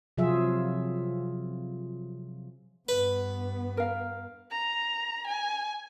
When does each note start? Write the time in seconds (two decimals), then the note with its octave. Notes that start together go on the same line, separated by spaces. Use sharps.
0.17 C3 F3 F#3 F4 G#4 E5
2.89 G2 B3 B4
3.77 A#4 F5
4.51 A#5
5.27 G#5